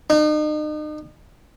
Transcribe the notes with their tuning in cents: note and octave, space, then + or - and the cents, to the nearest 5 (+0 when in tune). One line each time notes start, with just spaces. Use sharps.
D#4 -40